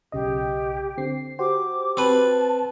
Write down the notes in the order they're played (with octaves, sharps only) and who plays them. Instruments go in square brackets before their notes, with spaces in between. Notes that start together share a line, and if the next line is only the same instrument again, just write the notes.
[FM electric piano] B1 C#3 D#5 [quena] G4
[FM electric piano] D3 C4 C7
[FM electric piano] F#4 G4 C5 [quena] D6
[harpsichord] C4 B4 [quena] A5